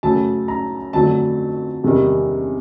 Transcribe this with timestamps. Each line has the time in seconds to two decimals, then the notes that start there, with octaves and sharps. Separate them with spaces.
0.03 F#2 C#3 F#3 A3 A5
0.48 A#5
0.93 F2 D3 F#3 A3 A5
1.83 E2 C3 D#3 G3